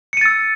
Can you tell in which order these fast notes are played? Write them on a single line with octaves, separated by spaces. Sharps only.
C#7 D#7 A6 E6